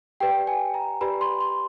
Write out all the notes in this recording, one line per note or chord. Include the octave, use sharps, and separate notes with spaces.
G4 B4 D5 G5
G#5
A#5
G4 B4 D5 B5
C6
C6